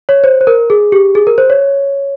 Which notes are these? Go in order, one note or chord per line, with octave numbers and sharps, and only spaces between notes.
C#5
C5
C5
A#4
G#4
G4
G#4
A#4
C5
C#5